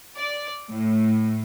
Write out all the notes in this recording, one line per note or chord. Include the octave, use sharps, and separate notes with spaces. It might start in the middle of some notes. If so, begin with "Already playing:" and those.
D5
A2